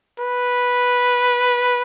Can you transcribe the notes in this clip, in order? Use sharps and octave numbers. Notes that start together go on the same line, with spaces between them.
B4